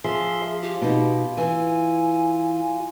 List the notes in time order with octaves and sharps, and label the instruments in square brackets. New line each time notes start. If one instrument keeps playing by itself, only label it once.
[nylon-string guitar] F3 [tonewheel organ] G#4 E5 C6
[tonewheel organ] F4 [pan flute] G4
[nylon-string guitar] B2 D#4
[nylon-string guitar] E3 [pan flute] G#5